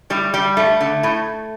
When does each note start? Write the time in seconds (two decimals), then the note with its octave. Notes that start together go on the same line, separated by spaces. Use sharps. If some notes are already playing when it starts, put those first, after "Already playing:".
0.10 A2 G3
0.34 G3
0.57 G2 A3
0.81 D3
1.03 A2